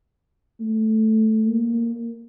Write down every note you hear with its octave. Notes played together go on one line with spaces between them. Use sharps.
A3
A#3